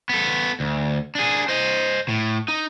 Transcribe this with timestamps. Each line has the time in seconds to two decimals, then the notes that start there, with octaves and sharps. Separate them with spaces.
0.09 B3 A4
0.60 D2
1.15 D4 G#4
1.48 C5 D#5
2.09 A2
2.48 D#4